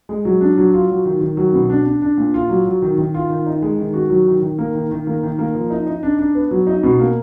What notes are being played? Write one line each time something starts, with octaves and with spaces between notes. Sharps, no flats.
G#3
F#3
D4
F#3
F4
F#3
D#3
D#3
F#3
B2
D4
D4
D4
A#2
F4
F#3
F#3
D#3
D#3
F4
D#3
D#4
G#3
D#3
F#4
F#3
D#3
D#3
A#3
D#3
D#3
A#3
D#3
A#3
F3
D#4
D#4
D4
D4
B3
F#3
D#4
B2
A#3